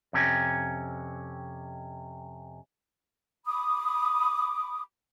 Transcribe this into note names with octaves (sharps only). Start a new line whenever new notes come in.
F2 C3 C#4
B5 D6 D#6